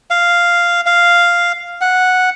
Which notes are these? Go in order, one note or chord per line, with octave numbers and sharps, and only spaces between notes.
F5
F5
F#5